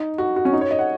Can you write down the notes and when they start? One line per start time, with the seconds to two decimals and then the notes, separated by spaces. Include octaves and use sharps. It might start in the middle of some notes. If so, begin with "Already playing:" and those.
Already playing: D#4
0.18 F#4
0.36 F#4
0.45 C#4
0.53 D#4
0.61 C#5
0.71 D#5
0.79 F#5